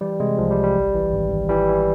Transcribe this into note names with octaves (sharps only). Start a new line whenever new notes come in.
E3 G3
C3 G#3
C2 F3
G3
C2
G3
G#1
E3
G#1
G#1
E3 G3
E3